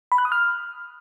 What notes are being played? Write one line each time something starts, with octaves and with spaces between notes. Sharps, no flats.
B5
F#6
D#6
F6